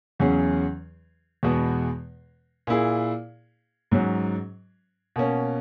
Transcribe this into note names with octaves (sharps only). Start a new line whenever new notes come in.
E2 C#3 F#3 C#4 G#4
E2 B2 G#3 B3 F#4
A#2 A#3 E4 G#4
G#2 F#3 C#4 F#4
B2 A#3 C#4